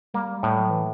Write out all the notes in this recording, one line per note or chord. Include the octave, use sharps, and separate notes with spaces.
G3 A#3
G3
A2
F#3
E3